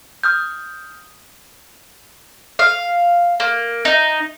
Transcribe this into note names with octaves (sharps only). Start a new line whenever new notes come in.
D#6 F6 G6
F5
A#3
D#4